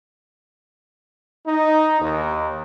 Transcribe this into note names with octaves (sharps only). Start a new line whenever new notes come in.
D#4
D#2